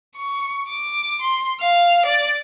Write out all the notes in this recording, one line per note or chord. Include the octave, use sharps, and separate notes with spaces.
C#6
D6
C6
F5
D5